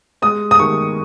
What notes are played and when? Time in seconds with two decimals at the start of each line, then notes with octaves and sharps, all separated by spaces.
0.22 G#3 D#6
0.51 D#6
0.59 D#3 C#6